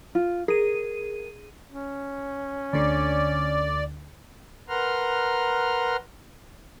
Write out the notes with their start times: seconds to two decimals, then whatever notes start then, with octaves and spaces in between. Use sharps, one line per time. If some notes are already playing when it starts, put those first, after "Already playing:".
0.15 F4
0.48 G#4 A#4 D#7
1.69 C#4
2.73 D2 D3 D5
4.69 A#4 B4 F#5 A#5 C6 F6